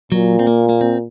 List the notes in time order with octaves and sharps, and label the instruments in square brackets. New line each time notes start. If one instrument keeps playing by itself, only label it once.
[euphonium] A#2 [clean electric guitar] F#3
[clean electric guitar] C4
A#3
A#3
C4